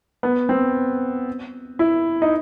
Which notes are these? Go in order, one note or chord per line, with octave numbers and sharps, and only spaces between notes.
B3
C4
E4
D#4